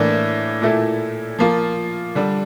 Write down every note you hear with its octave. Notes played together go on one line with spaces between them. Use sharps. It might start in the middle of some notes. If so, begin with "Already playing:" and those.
Already playing: A2 E3 A#3 D4
A#2 A3 E4
F3 A#3 F4
D3 G3 D4